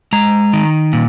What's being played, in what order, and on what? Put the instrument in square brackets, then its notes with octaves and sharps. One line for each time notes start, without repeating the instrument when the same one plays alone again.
[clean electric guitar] G#3 A#5
D#3
A#2